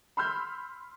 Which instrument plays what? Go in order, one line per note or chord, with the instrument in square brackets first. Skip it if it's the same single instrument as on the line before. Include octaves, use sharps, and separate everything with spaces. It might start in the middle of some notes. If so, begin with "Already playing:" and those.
[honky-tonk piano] B5 C6 E6 F6 G6